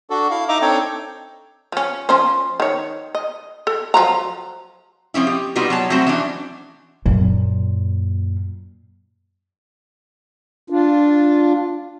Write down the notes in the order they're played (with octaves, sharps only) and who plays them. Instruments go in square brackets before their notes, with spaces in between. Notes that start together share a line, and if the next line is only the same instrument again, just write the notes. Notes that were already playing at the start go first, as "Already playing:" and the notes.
[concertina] D4 F#4 A4
E4 F5
D#4 D#5 E5 A#5 D6
C4 D4 D#4 A4 C#5 G5
[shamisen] F3 C#4
F3 C#4 C5
D#3 C#5
D#5
A4
F3 F#3 A#5
[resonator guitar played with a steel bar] F3 C4 C#4 E4
G4
G3 B3 D#4 F4 F#4
F#3 C#5 A5
F#3 G3 A3 C4 F#4 C5
E3 C#4 D4
[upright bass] F#2 A#2
[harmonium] D4 F4